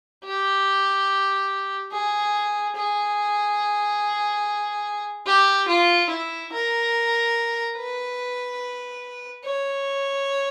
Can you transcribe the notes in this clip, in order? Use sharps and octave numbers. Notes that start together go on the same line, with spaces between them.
G4
G#4
G#4
G4
F4
E4
A#4
B4
C#5